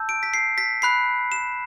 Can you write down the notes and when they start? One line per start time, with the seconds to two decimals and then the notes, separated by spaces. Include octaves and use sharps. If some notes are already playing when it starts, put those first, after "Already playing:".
Already playing: A5 E6 G6
0.09 D7
0.23 B6
0.34 C7
0.58 B6
0.82 B5 F#6 C7
1.32 E7